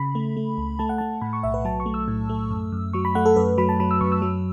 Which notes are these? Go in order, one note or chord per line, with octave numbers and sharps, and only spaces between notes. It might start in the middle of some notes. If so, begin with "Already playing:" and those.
Already playing: C#3 B5
A3
A3
C#2
A3 A5
F#5
A3 A5
A2 B5
C#6
B1 E5
B4
F#3 A5
C#6
A3
E6
A2
A3
F#2
F#2
F#3 C#6
B5
A3 F#5
A4
F#2 B4
F#3 B5
A5
F#3 B5
E6
F#2 C#6
E6
F#3